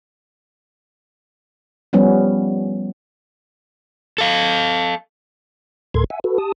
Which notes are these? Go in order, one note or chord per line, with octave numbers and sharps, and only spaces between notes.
F3 G3 B3 C#4
A4 F5
D2 A2 A4 A#4 C6 G#6
E5 F#5 G#5
F#4 A4 B4
G4 A5 D#6